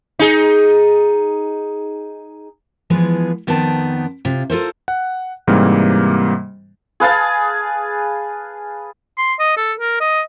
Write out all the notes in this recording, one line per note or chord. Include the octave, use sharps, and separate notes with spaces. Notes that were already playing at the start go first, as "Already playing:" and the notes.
D#4 G#4
E3 F3 G#3 B3
F2 D#3 B3 C4 D5 A5
C3 F4
F4 A4 A#4 C5
F#5
G#2 C3 E3 G3 A#3
G#4 B4 F5 A5
C6
D#5
A4
A#4
D#5